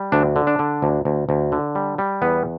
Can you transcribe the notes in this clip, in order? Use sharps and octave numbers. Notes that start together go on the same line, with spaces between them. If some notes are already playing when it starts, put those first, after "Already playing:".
Already playing: G3
D2 D4
D3
D4
D3
D2
D2
D2
D3
G3
G3
E2 B3